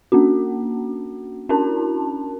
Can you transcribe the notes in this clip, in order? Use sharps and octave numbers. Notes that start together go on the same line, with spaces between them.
A#3 C#4 D4 F#4
C#4 D4 E4 F#4 A#4 A5